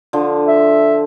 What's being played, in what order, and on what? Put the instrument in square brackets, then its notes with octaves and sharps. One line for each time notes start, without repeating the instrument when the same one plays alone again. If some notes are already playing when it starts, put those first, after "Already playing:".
[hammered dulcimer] D3 F3
[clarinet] E5